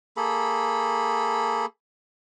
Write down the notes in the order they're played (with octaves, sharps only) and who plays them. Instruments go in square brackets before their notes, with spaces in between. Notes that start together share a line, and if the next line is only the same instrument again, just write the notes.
[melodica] A#3 G#4 A4 B5